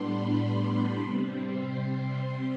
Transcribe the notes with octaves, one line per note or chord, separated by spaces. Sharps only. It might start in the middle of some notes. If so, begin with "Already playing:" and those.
Already playing: A2 G3 B3 D4 B5 C6
B5
C3 G3 C4
C6
C6
C6